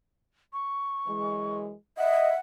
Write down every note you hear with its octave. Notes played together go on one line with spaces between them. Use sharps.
C#6
F#2 E3 G#3
D#5 E5 F#5